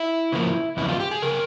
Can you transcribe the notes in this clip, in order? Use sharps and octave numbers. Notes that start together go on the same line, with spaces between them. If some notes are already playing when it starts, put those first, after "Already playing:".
Already playing: E4
C#3 F3 A#3
E2 C#3 F3 E4
F4
G4
G#4
C#3 A#4